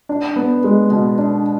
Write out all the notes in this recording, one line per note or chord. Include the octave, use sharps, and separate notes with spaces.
D4
B3
G#3
B2
D4